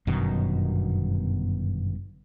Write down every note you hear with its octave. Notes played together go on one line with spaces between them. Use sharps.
G1 F#2 B2 D#3